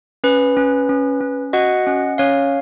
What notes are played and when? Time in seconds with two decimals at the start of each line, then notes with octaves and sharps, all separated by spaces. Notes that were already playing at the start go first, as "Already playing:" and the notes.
0.24 C#4 B4
0.57 C#4
0.89 C#4
1.21 C#4
1.53 F#4 D#5 F#5
1.87 C#4
2.18 C#4 C#5 F5